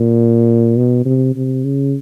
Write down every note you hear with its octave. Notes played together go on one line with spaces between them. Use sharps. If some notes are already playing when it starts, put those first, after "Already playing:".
Already playing: A#2
B2
C3
C3
C#3